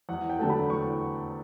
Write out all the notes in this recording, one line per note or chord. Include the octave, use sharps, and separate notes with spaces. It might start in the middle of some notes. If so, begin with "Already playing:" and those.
E2 F#5
G5
D3 F#3 A3 A5
B5
E2 C#6